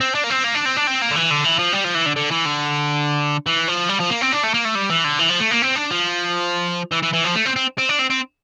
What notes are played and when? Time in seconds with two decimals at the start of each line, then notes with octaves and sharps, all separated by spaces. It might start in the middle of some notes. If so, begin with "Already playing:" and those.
0.01 C4
0.15 D4
0.24 A#3
0.30 C4
0.44 A#3
0.55 D4
0.66 C4
0.77 D4
0.87 C4
1.02 A#3
1.11 D3
1.16 E3
1.31 D3
1.44 E3
1.59 F3
1.73 G3
1.85 F3
1.95 E3
2.06 D3
2.16 D3
2.31 E3
2.46 D3
3.46 E3
3.68 F3
3.89 G3
4.00 F3
4.10 A#3
4.22 C4
4.32 D4
4.43 A3
4.54 A#3
4.65 A3
4.75 G3
4.90 E3
5.04 D3
5.19 E3
5.30 F3
5.40 A3
5.51 A#3
5.62 C4
5.76 D4
5.91 F3
6.91 E3
7.03 E3
7.13 E3
7.24 F3
7.35 A3
7.45 C4
7.56 C4
7.78 C4
7.89 D4
7.99 C4
8.10 C4